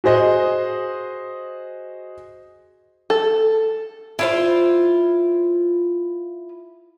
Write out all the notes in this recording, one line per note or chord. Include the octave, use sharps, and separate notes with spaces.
F#4 G#4 C5 D#5
A4
E4 F4 C5